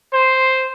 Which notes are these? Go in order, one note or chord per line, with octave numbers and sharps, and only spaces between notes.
C5